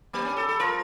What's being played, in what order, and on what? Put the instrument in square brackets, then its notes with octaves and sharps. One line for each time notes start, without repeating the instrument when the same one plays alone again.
[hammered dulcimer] G3 [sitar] A#3
[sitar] C#4
A4
A4
[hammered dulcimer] F3 [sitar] A#4